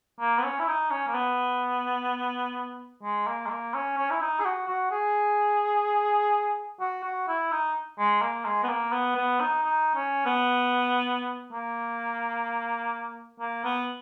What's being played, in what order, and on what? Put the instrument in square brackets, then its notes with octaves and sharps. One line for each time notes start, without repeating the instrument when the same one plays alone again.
[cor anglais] A#3
B3
C#4
E4
D#4
C#4
A#3
B3
G#3
A#3
G#3
A#3
C#4
C#4
E4
D#4
G#4
F#4
F#4
G#4
F#4
F#4
E4
D#4
G#3
A#3
G#3
B3
A#3
B3
B3
D#4
D#4
C#4
B3
A#3
A#3
B3